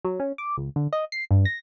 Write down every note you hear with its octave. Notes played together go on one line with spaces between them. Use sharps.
F#3
C#4
D6
C#2
D3
D#5
C7
G2
A#6